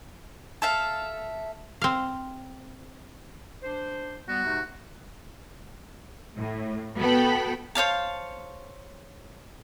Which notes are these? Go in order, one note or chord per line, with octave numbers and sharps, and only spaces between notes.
A4 E5 F5
C4 F5
D4 C5
G3 B3 F#4
G#2 C3 A3
A2
B3 F#4 A4 G5 B5
C5 C#5 F5 A5